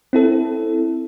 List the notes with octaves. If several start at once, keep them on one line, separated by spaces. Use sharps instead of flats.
C4 E4 A4